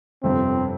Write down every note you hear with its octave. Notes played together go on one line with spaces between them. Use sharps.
G1 F2 C3 G3 C4